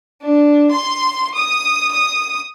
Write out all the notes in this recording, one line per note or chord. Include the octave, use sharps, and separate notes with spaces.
D4
C6
D#6
D#6